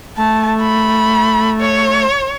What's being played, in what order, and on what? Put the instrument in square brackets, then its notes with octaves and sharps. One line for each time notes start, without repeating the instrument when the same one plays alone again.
[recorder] A3 [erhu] A5
[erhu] B5
C#5